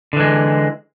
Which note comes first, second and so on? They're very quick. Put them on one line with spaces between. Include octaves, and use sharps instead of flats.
D3 E3 G#3